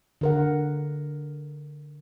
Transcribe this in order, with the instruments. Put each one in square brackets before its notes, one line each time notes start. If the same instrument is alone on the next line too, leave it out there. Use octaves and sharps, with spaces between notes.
[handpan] D3 A#4 F#5